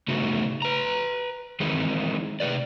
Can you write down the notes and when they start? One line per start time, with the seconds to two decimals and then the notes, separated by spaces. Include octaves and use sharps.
0.08 C#3 A3 B3 D#4 F#4
0.62 B4 A#5
1.60 D#3 E3 G#3 C4 D#4
2.40 C3 D#4 B4 D5